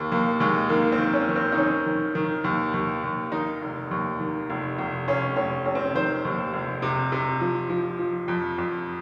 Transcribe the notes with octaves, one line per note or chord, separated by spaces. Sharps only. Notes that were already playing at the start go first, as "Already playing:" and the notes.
Already playing: D#2 A#3
D#2 A#3
D#2 G#3
D#3 A#3
C4
D#3
C#4
D#3
C4
D#4
D#3 C#4
D#3
D#3
D#2
D#2
D#2
D#3 D#4
F1
D#2
D#3
F1
F1
F1 C#4
F1 C#4
F1 C#4
C4
C#4
D#3 C5
D#2
F1
C3
C3
F3
F3
F3
F2
F2